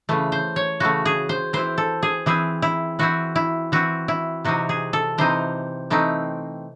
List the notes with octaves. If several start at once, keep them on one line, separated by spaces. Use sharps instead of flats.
C#3 E3 A3
C5
C#5
C#3 E3 A3 F#4
G#4
C5
E3 C4 E4 C5
A4
G#4
E3 C4 E4 G#4
E4
E3 C4 E4 F#4
E4
E3 C4 E4 F#4
E4
C3 E3 C4 D#4 F#4
G#4
A4
C3 E3 C4 D#4 C5
E3 A3 C4 D#4